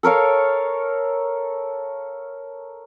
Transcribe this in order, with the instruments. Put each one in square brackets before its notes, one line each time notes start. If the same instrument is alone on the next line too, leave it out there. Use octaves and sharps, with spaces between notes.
[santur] A4 A#4 C#5 F5